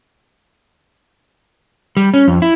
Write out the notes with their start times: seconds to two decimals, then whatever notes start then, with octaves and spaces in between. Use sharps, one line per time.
1.97 G3
2.14 C#4
2.28 F2
2.42 E4